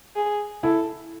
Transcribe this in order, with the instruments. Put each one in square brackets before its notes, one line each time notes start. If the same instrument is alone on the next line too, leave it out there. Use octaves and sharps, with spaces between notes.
[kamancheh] G#4
[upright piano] E4 [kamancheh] A4